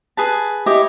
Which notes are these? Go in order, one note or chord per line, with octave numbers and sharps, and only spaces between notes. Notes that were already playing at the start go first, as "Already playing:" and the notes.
G#4 B4 A5
E4 G4 C#5 D#5